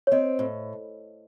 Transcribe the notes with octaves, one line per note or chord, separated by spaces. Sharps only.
C#5
C4 C5 D#5
A2